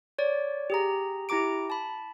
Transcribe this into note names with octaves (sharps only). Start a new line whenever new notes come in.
C#5 D5
G4 G#4 A#5
E4 G4 A#5 D6 D7
A5 B5